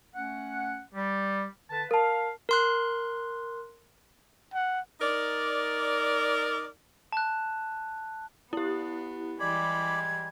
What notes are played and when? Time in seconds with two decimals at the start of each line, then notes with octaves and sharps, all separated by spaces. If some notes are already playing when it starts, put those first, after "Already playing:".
0.15 A3 C#4 F#5
0.94 G3
1.71 D3 B4 A5
1.91 A#4 F5 A5
2.49 A#4 C6 F#6
4.54 F#5
5.00 D#4 A#4 D5
7.12 A5 F#6
8.53 B3 E4 G4
9.40 E3 G3 G#3 D5 B5 G#6